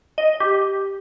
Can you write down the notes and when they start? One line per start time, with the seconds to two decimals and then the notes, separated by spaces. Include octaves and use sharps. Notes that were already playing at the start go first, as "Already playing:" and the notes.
0.18 D#5
0.40 G4